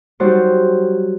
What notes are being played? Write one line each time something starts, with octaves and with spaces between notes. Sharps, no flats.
F#3 G3 D#4 F#4 C5 D5